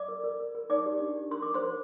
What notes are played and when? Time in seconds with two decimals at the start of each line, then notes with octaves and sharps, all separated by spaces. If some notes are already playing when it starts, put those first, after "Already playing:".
Already playing: D5 D6
0.08 A#4
0.24 A#4
0.39 A#4
0.55 A#4
0.69 D#4 D5 D6
0.86 G4
1.00 D4
1.15 G4
1.31 A#4 C6
1.42 A#4 D6
1.54 C5 C6
1.62 A#4